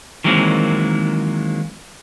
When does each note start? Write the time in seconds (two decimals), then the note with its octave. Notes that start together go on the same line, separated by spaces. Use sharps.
0.24 D#3 E3 F#3 G#3 A#3 C4